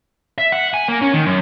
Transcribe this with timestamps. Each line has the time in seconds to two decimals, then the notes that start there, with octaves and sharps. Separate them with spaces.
0.38 E5
0.52 F#5
0.74 G#5
0.88 A#3
1.02 C#4
1.14 D#3
1.26 F#2